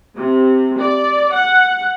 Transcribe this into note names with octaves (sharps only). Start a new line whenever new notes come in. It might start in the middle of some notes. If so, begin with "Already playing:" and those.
C3
D5
F#5